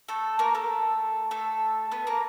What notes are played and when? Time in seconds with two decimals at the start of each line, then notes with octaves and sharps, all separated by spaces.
0.08 A3 A4
0.39 A#3 A#4
0.55 A3 A4
1.31 A3 A4
1.91 B3 B4
2.07 A#3 A#4